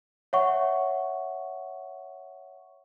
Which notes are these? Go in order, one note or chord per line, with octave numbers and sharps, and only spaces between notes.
C#5 E5 F#5 C#6